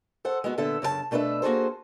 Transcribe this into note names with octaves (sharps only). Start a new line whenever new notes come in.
A4 C5 F#5
G#3 B3 F#4
A#2 D3 B3 A4 E5
F#2 C#3 A#4 A5
B2 A3 D4 A4 B4 E5
A#3 F#4 G#4 A4 C5